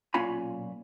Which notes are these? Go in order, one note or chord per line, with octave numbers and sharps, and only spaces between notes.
B1 A#2 C#4 F4 G#5 B5